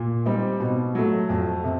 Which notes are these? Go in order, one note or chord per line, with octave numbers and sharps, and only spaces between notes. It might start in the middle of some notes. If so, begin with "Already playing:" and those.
Already playing: A#2
G3 C4 D#4
B2
F#3 A3
F2
C3